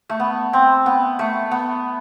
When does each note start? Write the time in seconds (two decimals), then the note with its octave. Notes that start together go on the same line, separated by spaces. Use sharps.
0.09 A3
0.20 B3
0.53 C4
0.86 B3
1.19 A3
1.51 B3